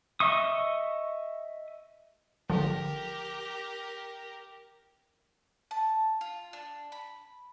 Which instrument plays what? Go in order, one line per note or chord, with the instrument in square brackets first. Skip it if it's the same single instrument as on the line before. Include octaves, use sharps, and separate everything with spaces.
[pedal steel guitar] D#5 E5 C#6 D#6
[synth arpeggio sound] G#1 D3 F3 [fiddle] G4 A#4
[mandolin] A5
F4
D4
B5